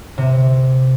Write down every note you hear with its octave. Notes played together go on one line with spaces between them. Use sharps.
C3